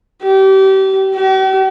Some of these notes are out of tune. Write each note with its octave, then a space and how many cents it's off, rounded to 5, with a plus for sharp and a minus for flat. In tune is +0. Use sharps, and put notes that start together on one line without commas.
G4 -30
G4 -45